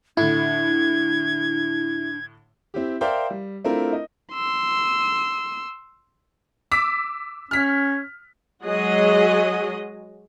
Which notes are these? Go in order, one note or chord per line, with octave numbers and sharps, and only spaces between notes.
A2 D3 D4 E4 G#6
C4 E4 G4
A#4 C5 D5 E5 F5 G5
G3
A3 C4 D4 E4 F4 A#4
D#5
C6 E6
D6 E6 B6
C#4 F6 B6
F#3 G#3 F#4 G#4 D#5